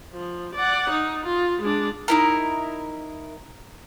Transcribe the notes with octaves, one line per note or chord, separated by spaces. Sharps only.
F3
D5 F#5
D#4
F4
G#3 D4
D#4 E4 A#4